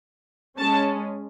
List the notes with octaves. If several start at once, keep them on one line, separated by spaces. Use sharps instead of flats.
G#3 C#4 A5